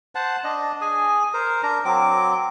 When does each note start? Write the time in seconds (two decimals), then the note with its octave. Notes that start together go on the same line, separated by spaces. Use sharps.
0.15 C5 F#5 A5
0.44 D4 D#5
0.81 G#4 G#5
1.33 A#4 C5
1.63 D4 A#4 A#5
1.85 F#3 C4 D6